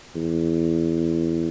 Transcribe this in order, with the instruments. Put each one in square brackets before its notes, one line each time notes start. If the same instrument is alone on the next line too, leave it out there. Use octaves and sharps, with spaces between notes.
[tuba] E2